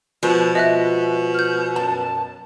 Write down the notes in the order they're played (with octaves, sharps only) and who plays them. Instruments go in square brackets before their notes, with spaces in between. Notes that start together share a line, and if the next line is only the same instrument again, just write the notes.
[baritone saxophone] B2 [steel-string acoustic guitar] F3 G#3
[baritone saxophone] B2 [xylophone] D#5 E5 F#6
[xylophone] F6 G6
[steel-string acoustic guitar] F#2 [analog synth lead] A5